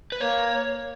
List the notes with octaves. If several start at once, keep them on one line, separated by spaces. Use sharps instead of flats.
B4
A#3 C#5